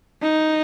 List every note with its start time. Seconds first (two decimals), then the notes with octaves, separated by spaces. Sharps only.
0.22 D#4